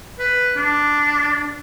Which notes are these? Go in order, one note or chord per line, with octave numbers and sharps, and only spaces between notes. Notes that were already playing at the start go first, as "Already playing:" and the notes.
B4
D4